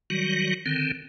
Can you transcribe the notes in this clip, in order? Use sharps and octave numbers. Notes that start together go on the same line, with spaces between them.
D#3 F#3 G3 F#4
D3 D#3 C4